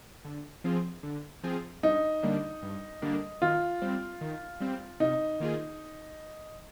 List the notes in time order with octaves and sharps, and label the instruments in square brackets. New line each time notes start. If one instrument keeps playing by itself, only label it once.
[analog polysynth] D3
F3 C4 F4 G#4
D3
F3 C4 F4 G#4
[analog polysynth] G2 [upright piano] D#4
[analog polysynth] D3 G3 A#3 D4
G2
D3 G3 A#3 D4
[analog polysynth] D#3 [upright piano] F4
[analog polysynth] G3 C4
D#3
G3 C4
[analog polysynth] C3 [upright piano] D#4
[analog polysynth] D#3 A#3 F4 G#4